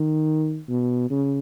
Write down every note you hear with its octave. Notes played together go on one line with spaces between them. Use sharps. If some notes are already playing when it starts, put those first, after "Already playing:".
Already playing: D#3
B2
C#3